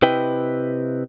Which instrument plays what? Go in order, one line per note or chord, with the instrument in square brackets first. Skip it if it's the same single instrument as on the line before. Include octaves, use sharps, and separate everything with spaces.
[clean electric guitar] C3 E4 B4 D#5 G5